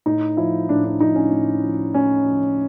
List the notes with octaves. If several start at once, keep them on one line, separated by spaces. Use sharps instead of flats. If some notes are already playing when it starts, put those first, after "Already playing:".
A2 D#4
F3 E4
A2 D4
D4
F3 D#4
C#4
A2
F3
A2 C#4
F3